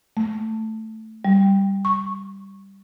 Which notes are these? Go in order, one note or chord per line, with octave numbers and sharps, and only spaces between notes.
A3
G3
C#6